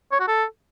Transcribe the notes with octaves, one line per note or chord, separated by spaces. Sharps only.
C#5
F#4
A4